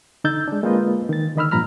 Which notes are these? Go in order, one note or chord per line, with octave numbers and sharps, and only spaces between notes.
D3 D#4 E6 G6 A6
G#3 D4
G#3 A#3 C4 F4 B4 D#5
D#3 A6
D3 D#3 D#5 B5 E6 F6
G2 A#2 F3 A#5 B5 F6